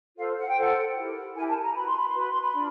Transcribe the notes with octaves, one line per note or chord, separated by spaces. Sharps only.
F4 A4 C5 F5
F#5
G5
F4 A4 C5 F#5
E4 G4 A#4
E4 G4 A#4 G#5
A5
A#5
F#4 B4 B5
C6
B5
C6
F#4 B4 B5
C6
B5
D4 F4